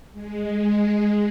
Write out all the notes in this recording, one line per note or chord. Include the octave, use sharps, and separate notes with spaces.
G#3